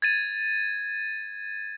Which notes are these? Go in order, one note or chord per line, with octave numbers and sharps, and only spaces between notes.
G#6 A6 D#7